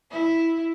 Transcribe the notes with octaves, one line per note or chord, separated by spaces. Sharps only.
E4